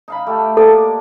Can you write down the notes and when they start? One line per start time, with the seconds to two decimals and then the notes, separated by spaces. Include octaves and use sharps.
0.08 D#4 F5 B5
0.27 A3 G4
0.57 A#3 D4 A4 D6